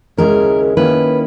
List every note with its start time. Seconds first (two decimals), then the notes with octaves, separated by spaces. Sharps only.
0.17 D#2 C#3 G#3 C#4 E4 A#4
0.77 D#3 A#3 C#4 E4 B4